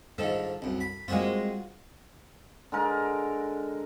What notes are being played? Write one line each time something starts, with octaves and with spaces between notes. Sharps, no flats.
G#2 D#3 F3 A4
C2 F#2
B5
G#3 A#3 C4 F4 F#4
D3 G#3 A#4